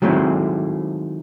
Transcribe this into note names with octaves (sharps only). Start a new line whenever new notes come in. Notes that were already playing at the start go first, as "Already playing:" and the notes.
D#3 F#3 G#3 A3 C4 E4